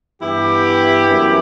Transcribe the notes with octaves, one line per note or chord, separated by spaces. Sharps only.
G2 E3 B3 E4 G4
F#2 E3 B3